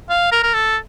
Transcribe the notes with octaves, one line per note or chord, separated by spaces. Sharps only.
F5
A#4
A#4
A4